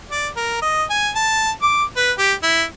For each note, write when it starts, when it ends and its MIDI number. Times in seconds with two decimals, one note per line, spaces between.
0.11 0.27 74
0.36 0.59 70
0.62 0.84 75
0.90 1.10 80
1.15 1.50 81
1.62 1.83 86
1.96 2.12 71
2.18 2.33 67
2.43 2.64 64